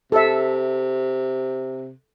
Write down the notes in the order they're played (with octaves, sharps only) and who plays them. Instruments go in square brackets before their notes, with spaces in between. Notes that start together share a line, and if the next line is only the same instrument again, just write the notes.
[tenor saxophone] C3 [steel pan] A4 E5